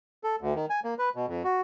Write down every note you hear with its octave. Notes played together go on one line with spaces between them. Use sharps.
A4
D2
D#3
G#5
A#3
B4
B2
F2
F#4